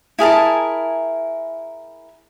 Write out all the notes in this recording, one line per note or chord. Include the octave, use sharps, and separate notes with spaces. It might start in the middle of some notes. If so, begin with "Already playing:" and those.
E4 G#4 A#4 A5